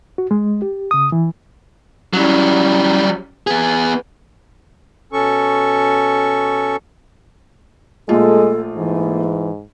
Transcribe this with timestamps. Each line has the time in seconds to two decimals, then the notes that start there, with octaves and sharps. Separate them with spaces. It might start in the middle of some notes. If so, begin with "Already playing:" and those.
0.18 F#4
0.31 G#3
0.62 G4
0.91 C#3 D#6
1.12 E3
2.13 F#3 G3 C#4 E4
3.47 B3 G#4 B4
5.13 B2 C#4 A4 C#6
8.09 A#1 G#3 A3 F4 A4
8.75 G#2 E3